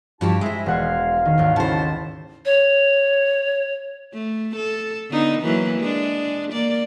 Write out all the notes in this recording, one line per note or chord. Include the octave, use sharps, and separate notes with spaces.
G2 F3 E4 F#4 G4 A5
G#3 E4 G#4 C5 E5
E1 F5 F#5 G#6
D#3
G#1 D#2
C#3 E4 C5 A5
C#5
A3
A4
D3 B3 D#4
E3 F#3 A#3
G#3 D4
A#3 D5